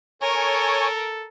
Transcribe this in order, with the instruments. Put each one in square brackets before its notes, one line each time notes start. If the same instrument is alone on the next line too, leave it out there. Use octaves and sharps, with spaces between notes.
[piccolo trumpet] A4 [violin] A#4 [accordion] C#5 G#5 C#6